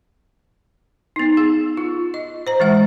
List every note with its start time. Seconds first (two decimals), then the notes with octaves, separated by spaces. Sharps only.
1.16 B3 D#4
1.37 G#4
1.77 F4
2.14 D#5
2.47 C5 A#5
2.60 E3 G#3 F#5